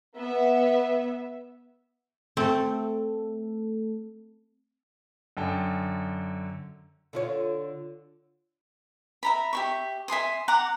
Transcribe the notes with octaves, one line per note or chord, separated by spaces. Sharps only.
B3 E5
A3 C4 A4
F#2 D3 G5 A5
D3 F4 C#5
E5 A#5 B5
G4 E5 C#6
E5 G#5 C6 D#6
F#5 A#5 D6